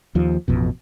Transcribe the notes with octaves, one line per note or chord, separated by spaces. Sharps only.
D#2 F3
A1 F2 B2